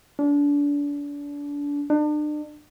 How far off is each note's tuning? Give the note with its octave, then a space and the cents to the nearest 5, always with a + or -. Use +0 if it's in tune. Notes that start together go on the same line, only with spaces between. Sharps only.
D4 -30
D4 +35